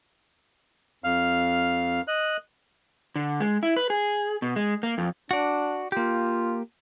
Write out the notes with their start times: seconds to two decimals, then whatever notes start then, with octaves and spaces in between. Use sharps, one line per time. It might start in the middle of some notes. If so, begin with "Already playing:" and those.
1.04 F2 F5 F6
2.08 D#5 F#6
3.16 D3
3.40 G#3
3.63 E4
3.76 B4
3.90 G#4
4.42 B2
4.56 G#3
4.83 A#3
4.98 F2
5.31 D4 F#4 D5
5.92 A#3 F4 G4